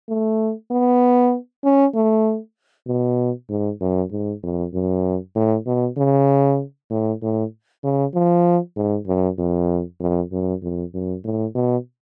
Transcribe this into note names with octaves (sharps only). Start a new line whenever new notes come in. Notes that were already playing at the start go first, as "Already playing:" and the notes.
A3
B3
C#4
A3
B2
G#2
F#2
G#2
F2
F#2
A2
B2
C#3
A2
A2
C#3
F3
G#2
F#2
F2
F2
F#2
F2
F#2
A2
B2